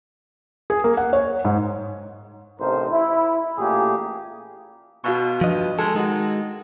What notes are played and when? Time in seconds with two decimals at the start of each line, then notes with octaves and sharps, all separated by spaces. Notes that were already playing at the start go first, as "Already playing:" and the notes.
0.70 G#4
0.84 A#3
0.97 F#5
1.13 C#5
1.45 G#2
2.60 A1 C3 D#4 A#4 C5
2.90 E4
3.57 A1 A#2 A3 A#3 G4 G#4
5.04 B2 F#4 F5 C#6
5.41 G2 F3 D#5
5.79 G#3 A4 G#5
5.95 D#3 G#3 F#4